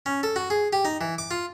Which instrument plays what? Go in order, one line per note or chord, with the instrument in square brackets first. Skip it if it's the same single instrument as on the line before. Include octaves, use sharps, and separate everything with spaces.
[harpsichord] C#4
A4
F#4
G#4
G4
D#4
E3
D6
F4